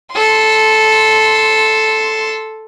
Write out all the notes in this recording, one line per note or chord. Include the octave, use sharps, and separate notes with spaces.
A4 C6